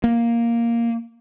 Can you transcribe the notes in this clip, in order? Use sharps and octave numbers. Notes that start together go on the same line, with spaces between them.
A#3